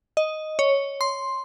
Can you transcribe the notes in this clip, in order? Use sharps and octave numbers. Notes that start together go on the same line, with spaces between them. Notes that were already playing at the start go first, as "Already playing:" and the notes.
D#5
C#5
C6